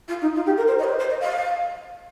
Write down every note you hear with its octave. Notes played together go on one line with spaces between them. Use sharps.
F4
D#4
F4
G4
A#4
C5
D#5
A#4
C5
C5
D#5
F5